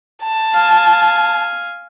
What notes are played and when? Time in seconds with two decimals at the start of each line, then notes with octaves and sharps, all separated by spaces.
0.23 A5
0.54 F5 G#5